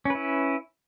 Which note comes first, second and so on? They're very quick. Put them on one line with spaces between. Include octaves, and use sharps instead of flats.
C#4 B4 E4